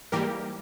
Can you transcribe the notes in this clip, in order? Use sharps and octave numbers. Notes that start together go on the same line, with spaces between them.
G#2 E3 G3 A#3 G4 A#4